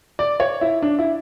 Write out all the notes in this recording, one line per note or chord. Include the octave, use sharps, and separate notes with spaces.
D5
C#5
E4
D4
E4